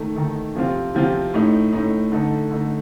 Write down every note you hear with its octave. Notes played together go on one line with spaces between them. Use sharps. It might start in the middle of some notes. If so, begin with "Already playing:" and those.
Already playing: D#3 A3 D#4 A4
D#3 A3 D#4 A4
C3 F3 C4 F4
C3 F3 C4 F4
A2 A3 D#4
A2 A3 D#4
D3 A3 D#4 A4
D3 A3 D#4 A4